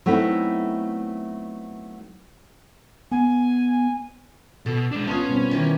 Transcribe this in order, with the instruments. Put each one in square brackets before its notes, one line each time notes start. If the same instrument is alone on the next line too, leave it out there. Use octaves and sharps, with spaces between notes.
[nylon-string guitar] F#3 A3 B3 C4 D#4 E4
[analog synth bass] B3 [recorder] G#5
[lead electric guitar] B2 [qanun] A4
[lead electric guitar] G#3 D4
[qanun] B3 F4 [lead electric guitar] C#4 [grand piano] A5 C6 D#6
[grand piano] B2 G3 C4
[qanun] D#3 E3 G4